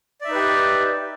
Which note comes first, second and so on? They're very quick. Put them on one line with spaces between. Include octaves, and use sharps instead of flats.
D5 E5 D#4 B4 G4